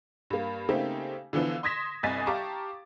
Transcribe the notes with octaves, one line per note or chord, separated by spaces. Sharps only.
G2 A#3
C#3 A3 A#3 C4 D#4 G4
D3 E3 F3 B3 D4
C6 D#6 G#6 A#6 B6 E7
G1 C2 D#5 G#5 A6 B6
G4 F5 A5 A#5 C#6 D6